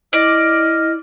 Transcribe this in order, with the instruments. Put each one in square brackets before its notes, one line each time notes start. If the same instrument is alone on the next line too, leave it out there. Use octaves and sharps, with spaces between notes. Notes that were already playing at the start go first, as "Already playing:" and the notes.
[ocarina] E4 [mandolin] D5 [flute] D#5 [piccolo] F6